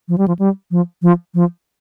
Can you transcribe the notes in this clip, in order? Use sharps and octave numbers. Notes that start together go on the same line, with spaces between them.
F3
G3
F3
G3
F3
F3
F3